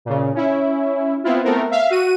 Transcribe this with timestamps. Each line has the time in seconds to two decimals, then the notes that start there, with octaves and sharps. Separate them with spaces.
0.05 A#2 C#3
0.34 C#4 E4
1.24 B3 C4 E4 F4
1.44 A3 B3 C4 A#4
1.71 E5 F5
1.90 F#4 D#7